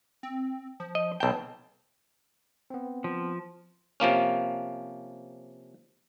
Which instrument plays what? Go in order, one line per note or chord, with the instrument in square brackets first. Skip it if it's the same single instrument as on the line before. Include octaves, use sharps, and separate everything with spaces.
[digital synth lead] C4
F3
[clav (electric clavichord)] D#5
[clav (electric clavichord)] B1 G5 [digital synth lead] A5
[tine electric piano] B3 C4
[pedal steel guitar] F3
[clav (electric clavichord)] C3 F3 A#3 C#4